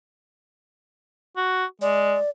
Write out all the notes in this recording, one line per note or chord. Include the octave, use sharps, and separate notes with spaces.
F#4
G#3 D5